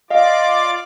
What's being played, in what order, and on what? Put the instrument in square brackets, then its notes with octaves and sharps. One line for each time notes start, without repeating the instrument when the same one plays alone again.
[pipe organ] F4 D5 D6 [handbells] D#5 F5